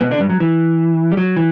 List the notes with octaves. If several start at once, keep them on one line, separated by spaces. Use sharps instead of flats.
B2 B3
D3 D4
G2 G3
F#3
E3
G3
F#3
E3